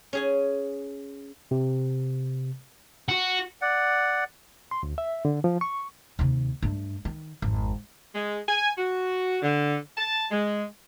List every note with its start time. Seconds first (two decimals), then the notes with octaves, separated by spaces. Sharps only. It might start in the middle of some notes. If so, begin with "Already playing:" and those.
0.13 C#4 G#4 G#5
1.51 C3
3.08 F#4
3.61 D5 F#5
4.71 C6
4.83 D2
4.98 E5
5.25 D3
5.44 F3
5.61 C#6
6.19 D#2 C3
6.62 G2 A3
7.05 D#3
7.42 G#1 F2
8.15 G#3
8.49 G#5
8.78 F#4
9.42 D3
9.98 A5
10.32 G#3